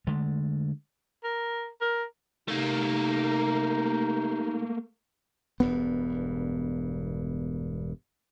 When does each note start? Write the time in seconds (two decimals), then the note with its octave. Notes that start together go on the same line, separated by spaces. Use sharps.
0.07 D3 G#3 A3
1.24 A#4
1.81 A#4
2.48 C3 A3 A#3 D#4
5.60 E1 G2 B3